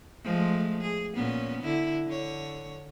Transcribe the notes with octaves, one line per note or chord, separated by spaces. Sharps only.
F3 G#3 A3
G#4
A#2 B3 C#4
D3 E4
D3 C#5